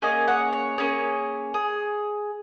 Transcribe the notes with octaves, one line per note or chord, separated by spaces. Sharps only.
A#3 C#4 G#4 D#5 G#5
C#5 F#5
C#5
A#3 C#4 G#4 C#5
G#4